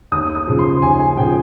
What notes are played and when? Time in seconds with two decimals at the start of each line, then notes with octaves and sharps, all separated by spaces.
0.12 D#2 D#6
0.35 D#6
0.47 C#3 F3
0.59 C6
0.82 D#2 G#5
0.99 G#5
1.17 C#3 F3 G5